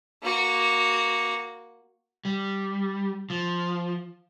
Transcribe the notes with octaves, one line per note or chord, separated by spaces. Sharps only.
A#3 F#4
G3
F3